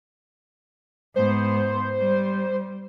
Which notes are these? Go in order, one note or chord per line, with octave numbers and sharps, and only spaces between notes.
G#2 B3 C5
G3